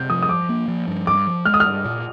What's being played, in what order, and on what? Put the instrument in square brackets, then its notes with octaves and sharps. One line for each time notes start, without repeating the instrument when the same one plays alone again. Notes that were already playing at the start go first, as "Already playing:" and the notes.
Already playing: [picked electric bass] C3 [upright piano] G6
[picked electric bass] F3 [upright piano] D#6
[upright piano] D#6
[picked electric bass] F3 [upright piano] D6
[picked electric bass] A#3
F3
G2
[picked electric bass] G2 [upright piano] D6
[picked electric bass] F3
[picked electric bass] G#3 [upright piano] F6
[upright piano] D#6
F6
[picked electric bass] G2
A#2